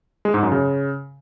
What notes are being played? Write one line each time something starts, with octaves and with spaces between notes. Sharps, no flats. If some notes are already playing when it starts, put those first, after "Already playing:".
G#3
G#2
F#2
C#3